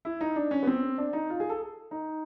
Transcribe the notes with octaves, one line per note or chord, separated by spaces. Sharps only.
E4
D#4
D4
C#4
B3
C4
D4
D#4
F4
G#4
A4
D#4